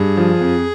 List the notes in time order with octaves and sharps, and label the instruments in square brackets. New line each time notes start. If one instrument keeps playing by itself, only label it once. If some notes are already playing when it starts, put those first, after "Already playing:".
Already playing: [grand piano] G2 [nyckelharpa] G#4
[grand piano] F3
F2